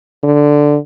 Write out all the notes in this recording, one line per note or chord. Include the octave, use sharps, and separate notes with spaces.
D3